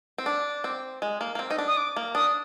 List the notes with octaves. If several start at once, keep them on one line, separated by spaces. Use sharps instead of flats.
C4
D4 D6
C4
G#3
A#3
A#3
C4
D#4
D4
D#6
D6
A#3
D4 D#6